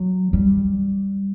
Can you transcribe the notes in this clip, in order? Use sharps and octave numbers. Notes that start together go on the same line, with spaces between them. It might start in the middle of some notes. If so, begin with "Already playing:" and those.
Already playing: F#3
G3